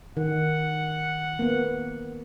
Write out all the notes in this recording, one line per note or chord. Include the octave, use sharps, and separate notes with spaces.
D#3 F#5
A#3 B3